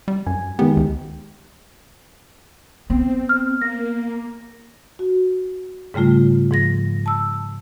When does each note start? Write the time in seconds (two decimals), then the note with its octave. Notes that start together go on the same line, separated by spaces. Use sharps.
0.08 G3
0.27 F#2 G#5
0.59 D#3 G#3 B3 G4
0.77 D2
2.90 B3 C4
3.29 F6
3.62 A#3 A#6
4.99 F#4
5.94 G#2 C#3 G3 A3 F4
6.51 G#2 F3 A#6
7.06 A5 E6